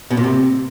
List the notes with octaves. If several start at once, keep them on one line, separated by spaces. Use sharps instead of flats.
B2
A#2
C3